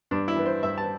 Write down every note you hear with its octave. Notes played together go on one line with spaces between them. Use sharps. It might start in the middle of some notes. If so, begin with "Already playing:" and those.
G2 D4
E4
E3 B3
C5
G2 E5
A5